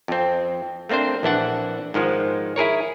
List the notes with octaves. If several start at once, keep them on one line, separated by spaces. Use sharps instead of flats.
F2 C4
A3 A#3 C4 D4 C5
A#1 E3 D4 F#5
G#2 D#3 F3 G#3
E4 G#4 A#4 C#5